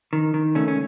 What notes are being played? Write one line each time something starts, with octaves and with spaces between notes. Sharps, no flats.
D#3
D#3
C#2 A3 C#4
C#4